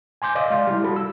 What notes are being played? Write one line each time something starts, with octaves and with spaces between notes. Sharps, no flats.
G#5 C6 D6 G6
D5 D#5 F5 D6
G#3 F5 C6
G3 E4
F#4 A4 B5
E6